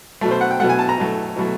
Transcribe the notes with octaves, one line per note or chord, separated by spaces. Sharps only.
B2 F#3 A3
C5
F#5
G5
B2 F#3 A3 F#5
G#5
A5
A#5
B2 F#3 A3
B2 F#3 A3